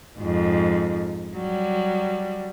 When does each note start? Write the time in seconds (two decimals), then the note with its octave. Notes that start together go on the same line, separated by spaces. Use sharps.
0.19 F2 G#2
1.36 F#3 G3